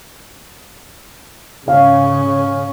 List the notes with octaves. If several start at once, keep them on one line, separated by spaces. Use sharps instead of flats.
G#2 C#3 C#4 F5